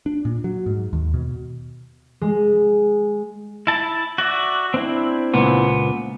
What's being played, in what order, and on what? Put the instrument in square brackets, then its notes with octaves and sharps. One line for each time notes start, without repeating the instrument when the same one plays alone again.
[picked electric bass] D4
A#2
F#3
G#2
D#2
B2
[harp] G#3
[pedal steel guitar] E4 A5
F#4 D5 E5
C4 D4 E4
[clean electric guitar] C#2 A#2 B3